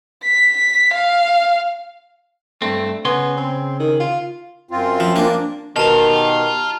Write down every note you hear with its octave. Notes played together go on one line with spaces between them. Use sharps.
B6
F5
G2 A3 C4
C#3 B3 G#4 C6
C4
D#3
F4
F#2 C4 F4
F3
A#3 D4
B2 D#3 F4 G4 A5 A#5